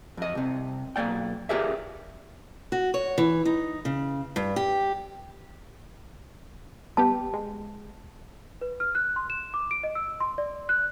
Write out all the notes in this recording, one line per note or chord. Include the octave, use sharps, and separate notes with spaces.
F2 D#5
C2 C3
B1 G2 A#3 D5 G5
F4 G4 G#4 A#4 D5 E5
F#4
C#5
E3
D#4
C#3
G2
G4
G3 B3 G4 A5
G#3
B4
F6
F#6
C6
E7
D6
D7
D#5
E6
C6
D5
F#6